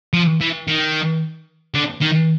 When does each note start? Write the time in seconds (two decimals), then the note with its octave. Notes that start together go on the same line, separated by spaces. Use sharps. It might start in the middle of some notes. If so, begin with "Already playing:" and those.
0.13 F3
0.41 E3
0.67 D#3
1.75 D3
2.01 D#3